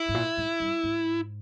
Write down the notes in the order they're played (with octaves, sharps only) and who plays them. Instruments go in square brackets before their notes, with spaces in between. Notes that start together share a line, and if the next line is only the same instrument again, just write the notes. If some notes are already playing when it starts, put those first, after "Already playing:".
Already playing: [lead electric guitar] E4
[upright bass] G#2
A#2
G#2
G2
G#2